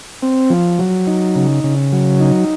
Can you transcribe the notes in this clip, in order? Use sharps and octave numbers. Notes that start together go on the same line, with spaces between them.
C4
F3
F#3
D#4
C#3
C#3
F#3
D#4